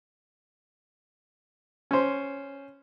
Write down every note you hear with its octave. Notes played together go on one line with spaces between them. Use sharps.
C#4 C5